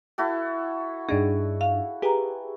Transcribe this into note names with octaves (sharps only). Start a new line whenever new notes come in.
E4 F#4 A4
G2 D4 D#4 G#4
F5
G4 G#4 B4 A#5